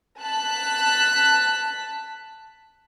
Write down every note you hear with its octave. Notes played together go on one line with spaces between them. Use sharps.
A5 F#6 B6